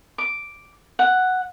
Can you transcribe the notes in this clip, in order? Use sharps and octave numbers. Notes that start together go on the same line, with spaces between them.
D6
F#5